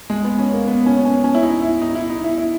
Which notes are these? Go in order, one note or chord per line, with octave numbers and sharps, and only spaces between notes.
G#3
B3
C#4
A#3
B3
C#4
C#4
C#4
E4
D#4
E4
D#4
E4
D#4
E4
E4